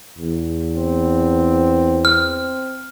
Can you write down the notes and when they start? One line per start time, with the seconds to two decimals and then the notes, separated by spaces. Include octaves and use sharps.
0.18 E2
0.77 C4
2.05 C4 F6